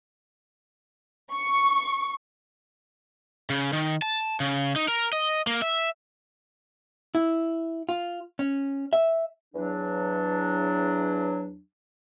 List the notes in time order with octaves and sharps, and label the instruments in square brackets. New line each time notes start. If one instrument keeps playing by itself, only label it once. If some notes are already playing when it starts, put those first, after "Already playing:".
[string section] C#6
[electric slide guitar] C#3
D#3
A5
C#3
D#4
A#4
D#5
A#3
E5
[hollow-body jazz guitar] E4
F4
C#4
E5
[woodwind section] E2 F#3 D4